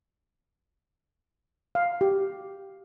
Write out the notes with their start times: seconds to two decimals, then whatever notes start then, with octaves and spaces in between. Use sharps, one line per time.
1.75 F5
2.01 G4